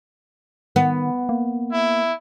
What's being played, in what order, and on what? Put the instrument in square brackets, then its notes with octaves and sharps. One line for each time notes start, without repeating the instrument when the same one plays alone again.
[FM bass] D#3 [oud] B3
[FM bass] A#3
[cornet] E4